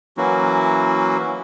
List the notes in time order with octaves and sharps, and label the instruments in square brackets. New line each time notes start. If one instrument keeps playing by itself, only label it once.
[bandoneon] E3 F#3 A#3 C#4 E4 F#4